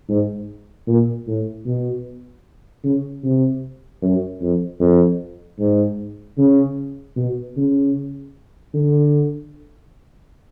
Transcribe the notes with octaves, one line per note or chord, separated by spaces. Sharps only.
G#2
A#2
A2
B2
C#3
C3
F#2
F2
F2
G#2
C#3
B2
C#3
D3